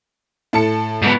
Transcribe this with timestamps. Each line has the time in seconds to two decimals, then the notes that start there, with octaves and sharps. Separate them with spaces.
0.53 A2 A5 C#7
1.02 G#2 B3